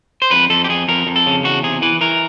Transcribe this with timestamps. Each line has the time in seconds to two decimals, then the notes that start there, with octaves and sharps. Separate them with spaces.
0.22 C5
0.31 F2 B4
0.50 F2 A4
0.64 G4
0.69 F2 G#4
0.88 F2 A#4
1.07 F2
1.16 A4
1.26 C#3
1.44 E2 F#4
1.63 C3 G#4
1.82 E3 B4
2.01 E3 A#4